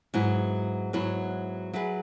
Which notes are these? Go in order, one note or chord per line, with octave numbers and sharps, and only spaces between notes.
G#2 F#3 B3 E4
G#2 F#3 B3 E4
F#3 E4 G#4 B4